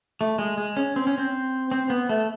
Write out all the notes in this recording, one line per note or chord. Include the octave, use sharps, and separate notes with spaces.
A3
G#3
G#3
C#4
C4
C#4
C4
C4
B3
A3